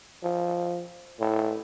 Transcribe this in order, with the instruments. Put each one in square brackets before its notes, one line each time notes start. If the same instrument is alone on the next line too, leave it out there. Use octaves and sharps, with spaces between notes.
[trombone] F3
A2